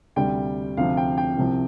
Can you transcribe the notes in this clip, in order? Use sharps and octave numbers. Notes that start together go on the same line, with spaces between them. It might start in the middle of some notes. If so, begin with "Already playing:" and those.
D2 C3 G3 G5
D2 C3 F3 C4 F5
G5
G5
C2 C3 F3 C4